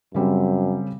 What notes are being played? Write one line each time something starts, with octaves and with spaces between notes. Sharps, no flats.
F#2 C#3 G3 C4